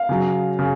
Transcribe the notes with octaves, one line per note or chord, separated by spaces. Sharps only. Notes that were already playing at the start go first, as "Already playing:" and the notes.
Already playing: F5
C#3 F#3
C#3